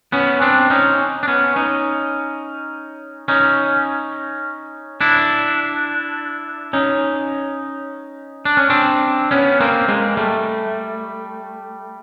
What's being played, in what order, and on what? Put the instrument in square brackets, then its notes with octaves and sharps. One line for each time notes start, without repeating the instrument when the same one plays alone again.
[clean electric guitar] B3 C#4
C4 D4
C#4 D#4
D4
B3 C#4
C#4 D#4
C#4 D#4
D4 E4
C#4 D#4
D4
C#4
C4 D4
B3 C#4
A#3 C4
G#3 A#3
G3 A3